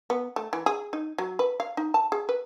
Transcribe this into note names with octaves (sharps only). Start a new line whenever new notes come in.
B3
A3
E3
G#4
D#4
F#3
B4
F5
D#4
A5
G#4
B4